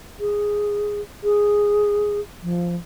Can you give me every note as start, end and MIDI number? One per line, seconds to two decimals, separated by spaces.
0.20 1.01 68
1.24 2.20 68
2.43 2.76 53